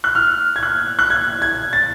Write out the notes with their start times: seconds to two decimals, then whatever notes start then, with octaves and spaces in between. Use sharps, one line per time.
0.04 F#6
0.15 F6
0.56 G#6
0.63 F#6
0.99 F#6
1.10 G#6
1.42 G#6
1.73 A6